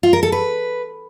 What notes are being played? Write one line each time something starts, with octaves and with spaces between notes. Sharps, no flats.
F4
A#4
A4
B4